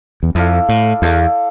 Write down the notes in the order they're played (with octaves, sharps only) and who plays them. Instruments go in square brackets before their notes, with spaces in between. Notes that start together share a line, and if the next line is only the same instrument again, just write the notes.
[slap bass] E2
[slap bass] F2 [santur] E4 A4 D5 F5
[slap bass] A2
[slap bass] E2 [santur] E4 A4 D5 F5